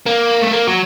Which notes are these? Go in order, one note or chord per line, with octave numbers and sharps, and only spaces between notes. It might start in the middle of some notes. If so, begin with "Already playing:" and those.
A#3
A3
A#3
F#3